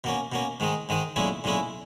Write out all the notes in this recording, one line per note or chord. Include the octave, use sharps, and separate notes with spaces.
B2 A#3 C#4
B2 A#3 C#4
G#2 D#3 G#3 D#4
G#2 D#3 G#3 D#4
B1 A#2 G#3 C#4 E4
B1 A#2 G#3 C#4 E4